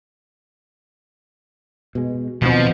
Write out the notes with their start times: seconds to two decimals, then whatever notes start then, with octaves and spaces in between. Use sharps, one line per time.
1.95 B2 G#3
2.42 D1 D#2 B2 F3 C4